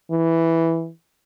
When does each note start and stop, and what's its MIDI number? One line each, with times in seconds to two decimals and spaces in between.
0.11 0.90 52